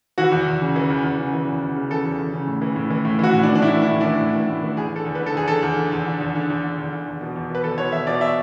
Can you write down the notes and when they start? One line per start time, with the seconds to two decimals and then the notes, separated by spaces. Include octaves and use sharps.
0.18 E3 F#4
0.32 E2
0.47 E2
0.62 C#3
0.76 E3
0.90 E2
1.04 E2
1.19 C#3
1.33 E3
1.47 E2
1.62 E2
1.76 C#3
1.90 E3 A4
2.05 E2
2.18 E2
2.33 C#3
2.47 A2
2.62 E3
2.76 A2
2.90 E3
3.05 A2
3.19 E3 F#4
3.33 A2
3.43 D4
3.48 E3
3.55 D4
3.62 A2 E4
3.76 E3
3.82 E4
3.91 A2
4.01 D4
4.06 E3
4.19 A2
4.34 E3
4.49 A2
4.63 E3
4.77 E2 G#4
4.92 D3 A4
5.05 E2
5.15 B4
5.20 D3
5.26 A4
5.35 E2 G#4
5.48 D3 A4
5.63 E2
5.77 D3
5.92 E2
6.06 D3
6.21 E2
6.35 D3
6.50 E2
6.63 D3
6.78 E2
6.93 D3
7.07 E2
7.21 B2
7.36 E2
7.50 B2 B4
7.64 E2 A4
7.78 B2 C#5
7.92 E2 E5
8.07 B2 D5
8.21 E5